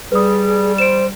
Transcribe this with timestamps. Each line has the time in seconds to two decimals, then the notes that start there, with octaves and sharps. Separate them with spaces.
0.12 G3 G#4 B4 D#6
0.78 C5 D7 E7